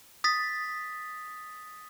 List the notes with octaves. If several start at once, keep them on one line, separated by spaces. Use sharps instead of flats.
D#6 A6 B6